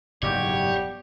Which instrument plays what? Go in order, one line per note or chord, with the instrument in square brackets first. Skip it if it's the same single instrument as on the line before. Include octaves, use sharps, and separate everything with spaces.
[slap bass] F#1 G#2 B2 [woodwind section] G3 B3 G4 [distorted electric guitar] C#5